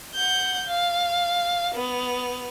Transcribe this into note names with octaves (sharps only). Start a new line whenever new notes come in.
F#5 G6
F5
B3 F7